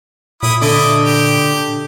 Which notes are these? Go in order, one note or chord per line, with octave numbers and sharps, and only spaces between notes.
A#2 E4 B5 D#6
D3 E4 D#5 D6
G4